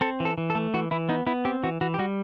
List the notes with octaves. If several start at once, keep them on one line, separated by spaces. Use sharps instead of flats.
C4 A4
E3
A4
E3
A4
A3
E3 F#4
E3 E4
B3 D#4
B3 E4
C4 G4
E3 F#4
E3 F#4
G4
G3 F#4